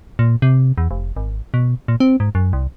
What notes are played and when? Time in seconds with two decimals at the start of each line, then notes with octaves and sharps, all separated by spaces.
0.19 A#2
0.42 C3
0.78 E2
0.91 F1
1.17 G#1
1.54 B2
1.88 A#2
2.00 C4
2.20 G#2
2.35 F#2
2.53 C2